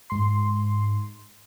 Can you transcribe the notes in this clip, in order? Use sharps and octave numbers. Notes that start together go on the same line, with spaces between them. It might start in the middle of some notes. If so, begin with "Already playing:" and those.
G#2 C6